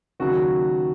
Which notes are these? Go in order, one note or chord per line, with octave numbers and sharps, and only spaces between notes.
D#2 C#3 F#3 F#4